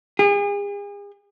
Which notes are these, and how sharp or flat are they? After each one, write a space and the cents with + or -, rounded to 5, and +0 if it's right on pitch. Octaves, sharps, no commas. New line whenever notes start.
G#4 -40